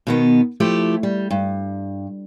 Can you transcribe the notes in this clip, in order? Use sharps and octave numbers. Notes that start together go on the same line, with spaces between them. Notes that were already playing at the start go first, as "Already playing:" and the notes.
B2 D#3 B3
F3 A3 E4 G4
G3
G2